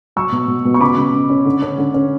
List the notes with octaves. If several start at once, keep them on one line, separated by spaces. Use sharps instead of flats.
F#3 C#6 E6
B2
B2
B2
C#6
C#3 B5 D6
C#3
C#3
C#4
D3
C#4
D3
C#4